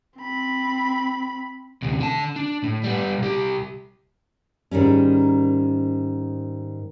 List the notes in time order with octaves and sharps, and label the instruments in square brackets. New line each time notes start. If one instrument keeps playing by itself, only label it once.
[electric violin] C4 B5
[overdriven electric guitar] D2 C3
D3 A5
D4
A2
G3 B3
C2 G4
[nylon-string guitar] G#2 D#3 G3 C#4